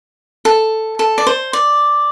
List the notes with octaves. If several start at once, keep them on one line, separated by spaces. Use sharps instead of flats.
A4
A4
D5
C5
D5